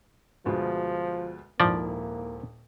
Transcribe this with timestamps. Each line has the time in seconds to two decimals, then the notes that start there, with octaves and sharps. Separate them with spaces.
0.45 D2 B2 F3 G#3
1.60 D#1 G#2 F3 A#3 E4 D5